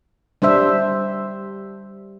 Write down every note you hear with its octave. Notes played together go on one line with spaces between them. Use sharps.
G3 D4 C5 E5